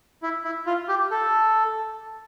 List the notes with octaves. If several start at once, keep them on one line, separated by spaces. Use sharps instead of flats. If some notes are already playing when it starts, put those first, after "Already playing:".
E4
E4
F4
G4
A4